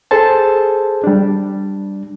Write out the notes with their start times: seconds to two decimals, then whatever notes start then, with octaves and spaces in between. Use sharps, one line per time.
0.11 G#4 A4 C5 A5
1.04 G3 D4